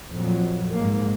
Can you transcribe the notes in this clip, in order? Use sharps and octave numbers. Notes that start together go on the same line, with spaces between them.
F2 A#2 F#3
G#2 A#3